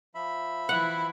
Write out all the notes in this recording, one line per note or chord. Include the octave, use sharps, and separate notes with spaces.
F3 E5 B5
E3 E4 F#5